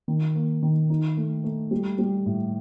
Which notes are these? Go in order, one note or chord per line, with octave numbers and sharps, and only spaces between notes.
D#3
A#3
D#3
D#4
A3
A3
G3
G3
A2